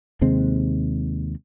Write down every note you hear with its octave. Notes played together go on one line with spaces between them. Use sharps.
D#2 C3 G#3 C4